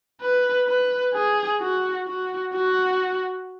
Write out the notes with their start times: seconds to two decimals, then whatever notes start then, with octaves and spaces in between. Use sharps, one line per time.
0.21 B4
0.67 B4
1.14 G#4
1.61 F#4
2.07 F#4
2.53 F#4